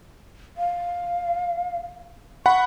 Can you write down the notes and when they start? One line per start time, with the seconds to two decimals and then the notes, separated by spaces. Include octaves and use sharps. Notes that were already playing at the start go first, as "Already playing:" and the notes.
0.57 F5
2.46 F#5 B5 C#6